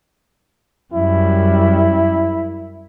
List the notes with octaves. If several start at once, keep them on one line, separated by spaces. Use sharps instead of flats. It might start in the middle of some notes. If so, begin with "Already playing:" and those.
F#2 G3 E4